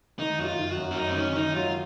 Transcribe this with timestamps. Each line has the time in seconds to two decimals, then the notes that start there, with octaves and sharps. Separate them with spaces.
0.19 D#3 D#4
0.38 F#2 F#4
0.45 F4
0.58 D#3
0.71 F#4
0.77 F#2
0.91 C#4
0.97 F#3 D#4
1.08 C4
1.16 D#3 C#4
1.31 C#4
1.35 D#3 D#4
1.55 F#3 F4